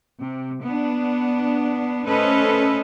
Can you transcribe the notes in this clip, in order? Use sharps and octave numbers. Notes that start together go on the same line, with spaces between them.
C3
B3 D4
A3 C#4 A4 B4 C5 D#5